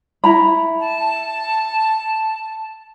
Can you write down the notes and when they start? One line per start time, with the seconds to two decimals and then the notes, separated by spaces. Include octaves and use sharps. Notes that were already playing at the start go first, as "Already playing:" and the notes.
0.24 E4 A#5 B5
0.79 A5